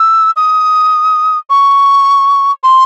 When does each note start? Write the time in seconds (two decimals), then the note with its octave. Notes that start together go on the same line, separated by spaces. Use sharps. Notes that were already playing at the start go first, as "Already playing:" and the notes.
Already playing: E6
0.36 D#6
1.50 C#6
2.63 C6